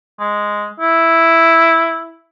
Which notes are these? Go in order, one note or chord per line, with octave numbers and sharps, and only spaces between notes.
G#3
E4